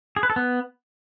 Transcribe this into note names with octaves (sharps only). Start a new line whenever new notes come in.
G#4
B4
A4
B3